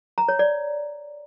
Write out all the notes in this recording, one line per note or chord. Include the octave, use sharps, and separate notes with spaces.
A#5
C#5
D5